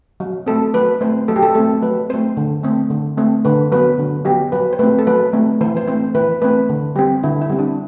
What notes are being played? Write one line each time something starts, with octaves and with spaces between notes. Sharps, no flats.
F#3
A3 C4 A4
F#3 B4
A3 C4 C5
F#3 A4
G4
A4
A3 C4 A4
F#3 B4
A3 C4 C5
D3
A3 C4
D3
A3 C4
D3 B4
F#3 B3 B4
D3
F#3 B3 G4
F#3 B4
C5
A3 C4 B4
A4
F#3 B4
A3 C4
E3 C5
C5
A3 C4 C5
E3 B4
A3 C4 B4
D3
G3 C4 G4
D3 E4
E4
G3 C4
D4